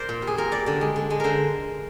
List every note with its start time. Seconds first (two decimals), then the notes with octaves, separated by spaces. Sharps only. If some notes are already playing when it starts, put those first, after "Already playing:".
Already playing: A#4 C5 D5
0.09 A#2
0.22 G3
0.27 G#4
0.38 A#2 A#4
0.51 G3 D5
0.66 D3 D5
0.81 G#3
0.96 D3
1.10 G#3
1.20 D3 A#4 C5